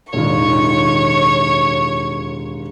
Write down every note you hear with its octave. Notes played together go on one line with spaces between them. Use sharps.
E1 D#2 A2 F4 C#5 C#6